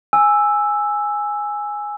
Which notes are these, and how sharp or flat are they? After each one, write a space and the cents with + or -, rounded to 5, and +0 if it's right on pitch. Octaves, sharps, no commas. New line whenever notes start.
G#5 +0 E6 +0